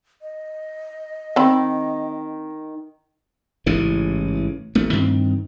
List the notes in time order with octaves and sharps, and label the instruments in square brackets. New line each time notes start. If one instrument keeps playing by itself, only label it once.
[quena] D#5
[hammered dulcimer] D#3 [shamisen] C4 B5
[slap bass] A1 G#2 C#3 E3
A1 A3
G2 D#3 C4